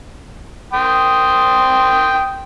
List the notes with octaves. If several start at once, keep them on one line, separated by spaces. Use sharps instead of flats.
G5 C6 D#6